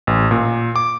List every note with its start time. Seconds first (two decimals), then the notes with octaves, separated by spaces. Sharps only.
0.07 A1
0.31 A#2
0.76 D6